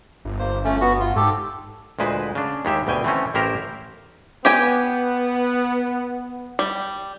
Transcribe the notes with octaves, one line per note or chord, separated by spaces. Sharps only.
G1
A#3 C5
A3 C#4
B3 F#4
F4
G#2 G4 A4
D2 A#2 G#3 B4 C5
C#3 D4
D#2 G#3 G4 E5
D2 B2 G5 G#5
E3 A3 C4 C#4
A1 E4 G4 A#4 C5 A#5
B3 G4 G5 G#5
G3